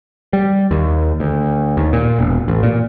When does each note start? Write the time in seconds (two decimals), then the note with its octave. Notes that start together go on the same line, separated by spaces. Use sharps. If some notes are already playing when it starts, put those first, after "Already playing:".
0.33 G3
0.71 D#2
1.20 D2
1.77 D#2
1.93 A#2
2.19 E1
2.48 A1
2.63 A#2